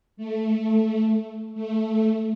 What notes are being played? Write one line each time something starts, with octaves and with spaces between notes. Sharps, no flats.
A3
A3